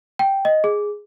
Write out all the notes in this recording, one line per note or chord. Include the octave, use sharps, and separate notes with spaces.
G5
D#5
G#4